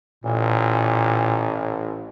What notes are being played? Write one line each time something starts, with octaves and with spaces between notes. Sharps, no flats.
A1 A#2